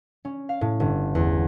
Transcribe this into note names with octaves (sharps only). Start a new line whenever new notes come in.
C#4
F5
A2
G1
E2